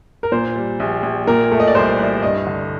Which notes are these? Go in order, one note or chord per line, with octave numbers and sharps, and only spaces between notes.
A#4
A#2 C5
G3
A#1
A#1
A#2 A#4
A3
D#5
D5
C2 C5
C2 D5
G2 D#5
D3